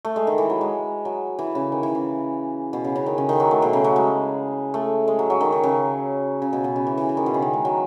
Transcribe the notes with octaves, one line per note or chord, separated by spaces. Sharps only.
A3
G#3
D#3
E3
F#3
G#3
F#3
E3
C#3
D#3
E3
C#3
B2
C#3
C#3
D#3
C#3
D#3
F#3
A3
B2
C#3
F#3
G#3
A3
G#3
F#3
F#3
D#3
D#3
C#3
C#3
B2
B2
C#3
E3
E3
E3
D#3
B2
C#3
D#3
G#3
F#3